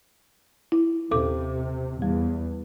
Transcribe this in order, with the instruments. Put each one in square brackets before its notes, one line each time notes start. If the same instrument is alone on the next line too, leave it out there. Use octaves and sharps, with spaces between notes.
[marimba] E4
[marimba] D#2 A4 D6 [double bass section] C3
[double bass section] E2 [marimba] G3